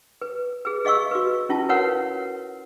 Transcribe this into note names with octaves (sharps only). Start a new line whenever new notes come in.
B4
G#4 B4
G#4 D#5 F5 C#6 E6
F#4 B4
C#4 E4 F4 A5
F#4 A#4 B4 C#5 F5 F#5